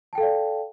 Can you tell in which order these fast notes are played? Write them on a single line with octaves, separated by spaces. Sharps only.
A5 G5 A4 F5 D5